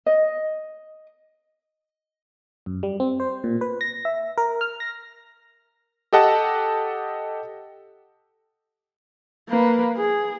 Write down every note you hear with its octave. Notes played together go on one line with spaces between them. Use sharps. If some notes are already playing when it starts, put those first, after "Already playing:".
D#5
F#2
G3
C4
C5
A#2
B4
A#6
E5
A#4
F6
A#6
G4 A4 D#5 F#5 A5
A#3 B4
G#4